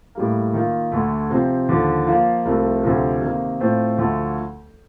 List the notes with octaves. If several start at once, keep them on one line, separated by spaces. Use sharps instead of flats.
A2 G3 A#3
D#3 A#3 F4
D2 D3 A3
C3 F3 C4
D#2 D3 F3
F3 A#3 F4
C2 C3 F3 A3
D2 C3 F3
C3 D#3 A#3
A2 A3 C4 F4 C5
D2 D3 F3 A3